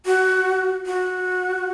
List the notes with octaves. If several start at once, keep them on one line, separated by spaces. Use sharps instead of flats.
F#4
F#4